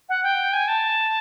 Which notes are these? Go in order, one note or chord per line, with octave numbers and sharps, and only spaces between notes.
F#5
G5
G#5
A5